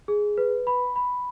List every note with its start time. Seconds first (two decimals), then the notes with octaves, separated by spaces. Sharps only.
0.08 G#4
0.38 B4
0.67 B5
0.96 B5